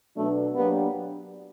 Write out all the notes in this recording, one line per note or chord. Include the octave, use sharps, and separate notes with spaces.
B2 F#3 A3 B3 D4
F#3 A#3 B3 D4 G4